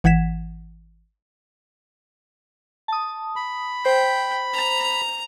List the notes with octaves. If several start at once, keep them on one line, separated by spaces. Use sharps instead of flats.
G#1 E3 F#5 G#6 B6 E7
A5 D#6
B5
C5 G5 B6
A#5